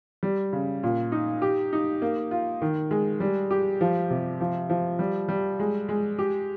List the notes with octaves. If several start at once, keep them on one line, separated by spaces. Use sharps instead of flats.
G3
C#3
A#2
D#4
G4
D#4
A#3
F4
D#3
G#3
G3
G4
F3
C3
F3
F3
G3
G3
G#3
G#3
G4